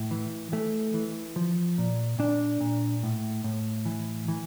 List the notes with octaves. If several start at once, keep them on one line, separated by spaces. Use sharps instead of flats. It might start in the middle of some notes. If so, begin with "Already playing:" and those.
Already playing: A2
E3
E3 A3
E3
F3
A#2
A#2 D4
A#2
A2
A2
E3
E3